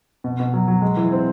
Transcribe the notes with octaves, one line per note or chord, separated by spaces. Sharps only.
B2
B2
F#3
F#3
G#3
E3
C4